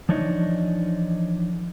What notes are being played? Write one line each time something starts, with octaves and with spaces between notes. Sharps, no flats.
E3 F3 D4 D#4 C#5 D#5